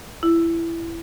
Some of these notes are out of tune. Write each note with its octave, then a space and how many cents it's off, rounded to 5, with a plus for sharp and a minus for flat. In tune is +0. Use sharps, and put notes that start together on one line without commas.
E4 +20